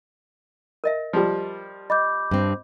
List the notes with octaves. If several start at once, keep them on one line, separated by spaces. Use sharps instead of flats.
A#4 D#5 E5
F3 G3
D#5 B5 D6 G6
G2 C4